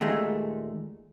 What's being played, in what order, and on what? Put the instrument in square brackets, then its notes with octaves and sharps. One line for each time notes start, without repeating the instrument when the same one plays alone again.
[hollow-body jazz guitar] D#2 A#2 G#3 A3